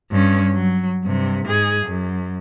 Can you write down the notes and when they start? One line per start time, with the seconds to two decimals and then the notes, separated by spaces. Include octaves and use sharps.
0.11 G2 C#4
0.53 F#3
1.04 G2 C3
1.45 G#2 G#4
1.86 F#2